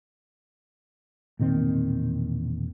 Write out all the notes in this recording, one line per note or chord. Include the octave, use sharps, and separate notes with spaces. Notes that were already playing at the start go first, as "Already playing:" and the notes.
E1 A#2 D#3 C4